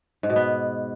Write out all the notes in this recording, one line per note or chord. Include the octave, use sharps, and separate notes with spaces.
G#2
B2
B3